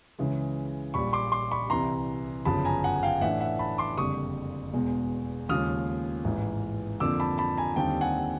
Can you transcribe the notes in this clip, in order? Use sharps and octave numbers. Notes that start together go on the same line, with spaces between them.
C#2 C#3 E3 G#3
A#1 A#2 G3 B5 C#6
C6 D6
C6 D6
B5 C#6
C2 C3 E3 A#5 C6
G1 F#2 C#3 F3 A5 B5
G#5 A#5
F#5 G#5
F5 G5
A2 E3 A3 D4 E5 F#5
E5 F#5
A5 B5
C6 D6
F#1 F2 D3 G3 C#6 D#6
E1 E2 B2 G#3
D#2 C#3 F3 G#3 D#6 F6
A1 G#2 E3
F2 D3 F3 A#3 D6 E6
A5 B5
A5 B5
G#5 A#5
D#2 D3 G3 C4 D#4 G5 A5
F#5 G#5